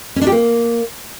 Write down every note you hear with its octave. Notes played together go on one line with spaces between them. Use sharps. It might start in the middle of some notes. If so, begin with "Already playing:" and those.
C#4
D4
G4
A#3